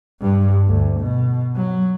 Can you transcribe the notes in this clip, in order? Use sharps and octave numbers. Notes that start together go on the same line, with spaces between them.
G2
D2
B2
F#3